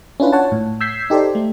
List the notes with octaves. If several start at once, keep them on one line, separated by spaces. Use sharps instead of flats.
C#4 D4 E4 F4 B4
C#5 F#5 A5
A2
E6 G6 G#6 B6 C7
D#4 G4 A4 C5 D5
A3